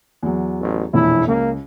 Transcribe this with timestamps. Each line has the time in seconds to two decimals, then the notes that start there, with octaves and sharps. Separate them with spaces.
0.23 E2 F#3
0.60 A1
0.93 E1 A#1 F2 E4
1.28 C#2 A#3